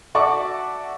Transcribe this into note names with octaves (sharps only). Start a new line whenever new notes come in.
F#4 A4 D5 E5 C#6 D6